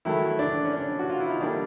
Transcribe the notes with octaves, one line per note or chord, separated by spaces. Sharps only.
D#3 F#3 A3 E4
D4
C#4
D4
F#4
F4
E4
D#4
D3 G3 A#3 D4